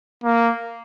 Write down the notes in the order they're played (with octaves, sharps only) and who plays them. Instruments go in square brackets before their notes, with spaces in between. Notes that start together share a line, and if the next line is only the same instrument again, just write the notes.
[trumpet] A#3